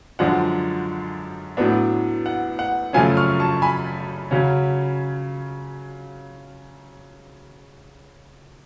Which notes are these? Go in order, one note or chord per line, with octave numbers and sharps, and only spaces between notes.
F#2 D3 F3 G#3 D4 F#5
A2 F#3 B3 D4
F#5
F#5
F#2 C#3 F3 A3 C#4 F5 G#5
C#6 F6
A5 C#6
G#5 B5
C#3 F#3 C#4